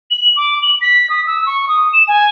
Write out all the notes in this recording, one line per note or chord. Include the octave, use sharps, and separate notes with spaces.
F#7
D6
F#7
B6
D#6
E6
C#6
D#6
E7
G#5